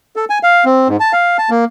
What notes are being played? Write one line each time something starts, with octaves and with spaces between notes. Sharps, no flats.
A4
G#5
F5
C4
G#2
A5
F5
A5
A#3